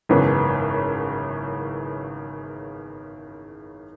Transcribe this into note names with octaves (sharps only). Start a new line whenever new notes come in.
G#1 F#2 C#3 E3 B3